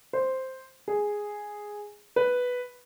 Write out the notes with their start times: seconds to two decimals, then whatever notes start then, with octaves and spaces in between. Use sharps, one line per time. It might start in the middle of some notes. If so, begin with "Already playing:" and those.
0.13 C5
0.88 G#4
2.16 B4